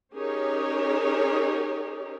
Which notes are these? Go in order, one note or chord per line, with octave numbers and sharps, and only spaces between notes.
C#4 D#4 G4 G#4 A#4 C#5